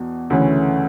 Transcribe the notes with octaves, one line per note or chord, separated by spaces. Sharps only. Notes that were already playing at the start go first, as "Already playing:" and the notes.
Already playing: E2 B2
D2 C#3 E3 A3 C#4